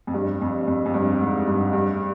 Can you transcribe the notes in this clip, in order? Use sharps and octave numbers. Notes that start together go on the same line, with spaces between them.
F2
G2
F2
F2
F2
G2
G#2
G2
G2